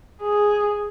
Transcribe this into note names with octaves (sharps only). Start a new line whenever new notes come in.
G#4